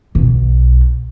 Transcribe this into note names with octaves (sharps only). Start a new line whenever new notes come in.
B1